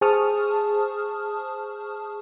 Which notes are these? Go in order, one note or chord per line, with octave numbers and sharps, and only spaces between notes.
G#4 C5 A5 C#6 D#6 F6